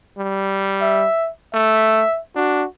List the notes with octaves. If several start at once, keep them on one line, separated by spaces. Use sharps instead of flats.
G3
E5
A3 E5
D4 F#4